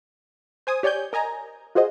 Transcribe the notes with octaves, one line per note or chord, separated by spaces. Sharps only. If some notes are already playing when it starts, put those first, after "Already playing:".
C5 G#5 D#6
G4 C#5 D5 G#5 G6
A#4 D#5 G#5 A#5
F4 F#4 G#4 C5 D#5